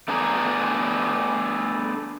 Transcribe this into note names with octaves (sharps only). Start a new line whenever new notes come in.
A3 B3 D4 G#4 A#5